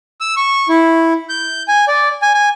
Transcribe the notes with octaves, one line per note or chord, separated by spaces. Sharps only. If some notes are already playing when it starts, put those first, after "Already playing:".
E6
C#6
E4
G6
G#5
D5
G#5
G#5